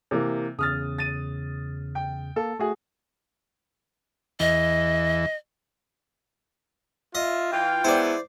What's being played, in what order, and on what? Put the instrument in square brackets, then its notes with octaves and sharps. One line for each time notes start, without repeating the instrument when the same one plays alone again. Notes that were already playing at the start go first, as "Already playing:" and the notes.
[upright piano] C3 E3 A#3
[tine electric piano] E2 C#3 [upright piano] D#6 F6 A6
[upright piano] A6 D#7
G5
[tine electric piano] A#3 [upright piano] A4
[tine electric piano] A3 [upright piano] F#4 G#4
[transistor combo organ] E2 E3 [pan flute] D#5
[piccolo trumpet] F4 [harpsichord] D#5 [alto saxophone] E5
[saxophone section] E3 F4 [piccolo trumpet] G5
[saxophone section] G#2 B3 [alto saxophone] E4 [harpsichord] C5 D5